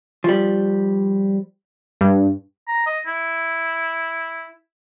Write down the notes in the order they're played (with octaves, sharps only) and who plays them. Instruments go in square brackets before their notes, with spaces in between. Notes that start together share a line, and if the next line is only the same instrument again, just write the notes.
[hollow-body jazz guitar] F3 G3
[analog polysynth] G2
[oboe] A#5
D#5
E4